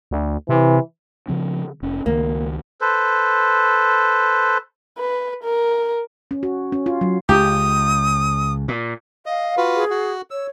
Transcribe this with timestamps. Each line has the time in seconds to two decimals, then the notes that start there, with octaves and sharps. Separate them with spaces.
0.11 D2
0.49 C3 E3
1.28 C#3 F3 C4
1.82 F1 C#4
2.06 C#2 D#3 A#3
2.81 A4 B4 C5
4.98 B4
5.43 A#4
6.31 C#4
6.43 F#4
6.72 C#4
6.86 F4
7.01 F#3
7.29 C#2 G4 D#6
8.68 A#2
9.26 D#5 F5
9.57 F4 F#4 B4
9.75 G#4
9.90 F#4
10.31 C#5 E6